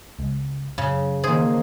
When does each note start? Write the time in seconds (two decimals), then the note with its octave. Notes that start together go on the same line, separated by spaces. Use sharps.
0.19 C#2
0.78 F#2 C#3
1.24 D#3 E3 A#3 G#4 C5